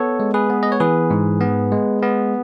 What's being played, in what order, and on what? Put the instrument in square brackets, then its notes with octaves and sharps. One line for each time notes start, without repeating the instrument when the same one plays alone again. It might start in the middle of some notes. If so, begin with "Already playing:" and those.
Already playing: [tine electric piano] B3 A4 C#5
G#3
G#4 B4
B3
D#5
C#5
E3 G#4 B4
G#2
B3
G#3
B3